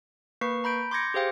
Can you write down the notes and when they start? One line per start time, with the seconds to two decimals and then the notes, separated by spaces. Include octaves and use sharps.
0.41 A#3 B4 C#6 C7
0.64 A#5 B5 G6 D7
0.91 C6 D6 G6 G#6 A#6 C#7
1.14 G4 G#4 C5 F5 G5